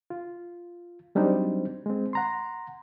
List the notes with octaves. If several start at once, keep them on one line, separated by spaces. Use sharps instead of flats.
F4
F#3 G3 C4 D4 D#4 C5
G#3 C4
F#5 A#5 C6